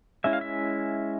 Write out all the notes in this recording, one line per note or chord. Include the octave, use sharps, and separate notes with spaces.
G#3 C#4 E4 E5
F5
E5